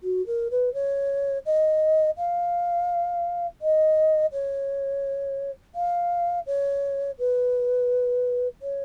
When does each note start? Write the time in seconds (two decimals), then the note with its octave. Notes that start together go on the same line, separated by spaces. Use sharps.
0.03 F#4
0.26 A#4
0.51 B4
0.74 C#5
1.46 D#5
2.17 F5
3.61 D#5
4.32 C#5
5.75 F5
6.46 C#5
7.19 B4
8.62 C#5